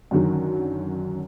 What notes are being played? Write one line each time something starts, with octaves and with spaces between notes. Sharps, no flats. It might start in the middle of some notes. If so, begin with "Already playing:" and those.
F#2 D3 D#3 F#3